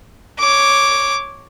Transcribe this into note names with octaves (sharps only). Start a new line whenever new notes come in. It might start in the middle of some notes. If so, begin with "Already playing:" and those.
C#5 D6